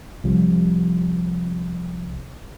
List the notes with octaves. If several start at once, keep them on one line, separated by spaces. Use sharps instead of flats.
C2 F3 G3